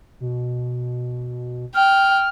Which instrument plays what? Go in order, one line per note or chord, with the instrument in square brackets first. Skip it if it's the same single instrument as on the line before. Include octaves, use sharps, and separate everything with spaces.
[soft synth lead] B2
[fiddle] G5 [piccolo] F6